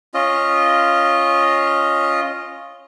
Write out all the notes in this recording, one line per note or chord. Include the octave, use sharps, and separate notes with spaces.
C#4 F4 D#5